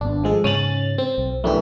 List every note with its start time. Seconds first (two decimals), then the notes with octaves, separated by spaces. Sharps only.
0.01 G#1 B3 D4
0.24 F3 G#3 A4
0.44 G#2 C#3 C#4 A6 D#7 F7 F#7
0.98 C4
1.18 B1
1.44 F#2 E3 A3 B3 D4 G4